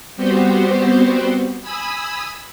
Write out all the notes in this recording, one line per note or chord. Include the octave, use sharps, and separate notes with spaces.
G3 B3 C4 F#4 G4 C5
G#5 B5 D#6 E6 G#6